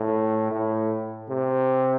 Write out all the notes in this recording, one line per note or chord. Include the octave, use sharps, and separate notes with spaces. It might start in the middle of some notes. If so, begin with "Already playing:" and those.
Already playing: A2
A2
C3